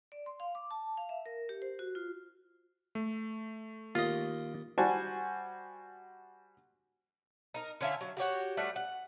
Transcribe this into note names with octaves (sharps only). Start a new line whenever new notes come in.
D5
C6
F5
D6
A5
F5
E5
A#4
G4
C5
F#4
F4
A3
D#2 F4 D#5
G3 F#4 C5 G#5 A5
D#4 A#4
D3 C#4 F4 E5
F#3
F#4 G4 C#5 F#5
G3 A3 F#5
F#5